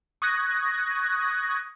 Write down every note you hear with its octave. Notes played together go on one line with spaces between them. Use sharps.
C#6 D#6 F#6 G#6 A#6